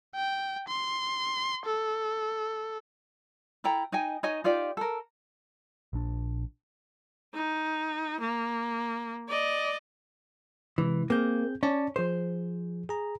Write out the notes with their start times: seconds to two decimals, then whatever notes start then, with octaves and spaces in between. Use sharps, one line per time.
0.15 G5
0.68 C6
1.66 A4
3.64 E4 A4 G5 A#5
3.92 D#4 D#5 G5 G#5
4.23 D#4 C#5 D#5 G#5
4.44 D#4 F4 G4 D5
4.77 A4 A#4
5.93 A#1 D4
7.34 D#4
8.20 A#3
9.28 D5 D#5
10.78 C3 E3 G#3
11.10 A#3 C4 G#4 G6
11.63 C#4 C#5 D5 A5
11.96 F3 G#4 C5
12.89 G#4 A#5